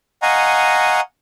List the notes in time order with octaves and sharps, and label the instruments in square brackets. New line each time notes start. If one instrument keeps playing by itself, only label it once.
[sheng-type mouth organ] D#5 F5 F#5 G#5 A#5 C#6